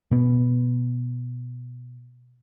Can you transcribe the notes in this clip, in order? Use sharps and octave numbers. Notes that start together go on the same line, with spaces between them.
B2 B3